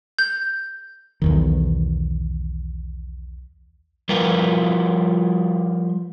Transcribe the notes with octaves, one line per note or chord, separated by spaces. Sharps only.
G6
B1 E2 D#3
F3 G3 F4 A#4 B4